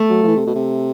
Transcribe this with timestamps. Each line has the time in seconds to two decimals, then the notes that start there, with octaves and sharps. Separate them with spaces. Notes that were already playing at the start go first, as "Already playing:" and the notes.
Already playing: A3
0.10 F#3
0.23 F3
0.27 E3
0.37 C3
0.47 B2
0.55 C3